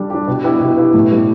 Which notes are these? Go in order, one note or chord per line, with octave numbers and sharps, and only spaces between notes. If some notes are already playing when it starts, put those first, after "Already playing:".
Already playing: G3 D4 G4
D4 G4
B2
B3 E4 G4
B2
B3 E4 G4
A2
G3 B3